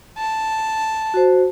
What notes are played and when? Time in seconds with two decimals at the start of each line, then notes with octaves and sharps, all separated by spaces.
0.18 A5
1.14 F#4 C5